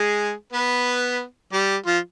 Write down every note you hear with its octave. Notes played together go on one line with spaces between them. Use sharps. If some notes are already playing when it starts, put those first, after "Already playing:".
Already playing: G#3 G#4
B3 B4
G3 G4
F3 F4